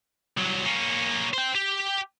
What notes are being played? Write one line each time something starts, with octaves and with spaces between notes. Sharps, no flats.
C2 F#3
A#3 C#4
C5 G5
G4